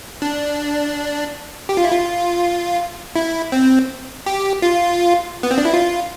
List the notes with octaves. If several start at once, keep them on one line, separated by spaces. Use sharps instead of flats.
D4
G4
F4
E4
F4
E4
C4
G4
F4
B3
C4
D4
E4
F4